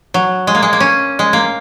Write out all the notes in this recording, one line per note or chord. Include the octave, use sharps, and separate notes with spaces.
F#3
G#3
A#3
G#3
A#3
C#4
G#3
A#3